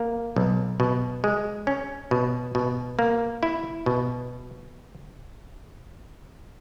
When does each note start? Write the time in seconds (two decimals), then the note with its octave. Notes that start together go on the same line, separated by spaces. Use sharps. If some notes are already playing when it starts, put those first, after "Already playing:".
Already playing: A#3
0.36 B1
0.80 B2
1.24 G#3
1.67 C#4
2.11 B2
2.55 B2
2.99 A#3
3.43 E4
3.86 B2